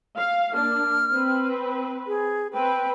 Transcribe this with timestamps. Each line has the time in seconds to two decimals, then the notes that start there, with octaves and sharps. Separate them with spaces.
0.17 F5
0.52 A#3 D4 F6
1.11 C4 B4
2.07 G#4
2.53 C4 B4 G5